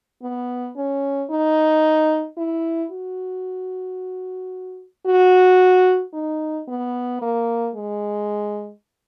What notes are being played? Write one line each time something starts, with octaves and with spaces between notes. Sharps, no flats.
B3
C#4
D#4
E4
F#4
F#4
D#4
B3
A#3
G#3